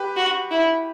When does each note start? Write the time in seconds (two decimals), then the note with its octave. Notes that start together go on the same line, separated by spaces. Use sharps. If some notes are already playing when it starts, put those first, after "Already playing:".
Already playing: G4 B4
0.16 F#4
0.51 E4